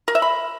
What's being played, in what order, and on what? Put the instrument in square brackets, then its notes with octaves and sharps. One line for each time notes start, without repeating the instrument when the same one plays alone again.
[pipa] A#4
E5
B5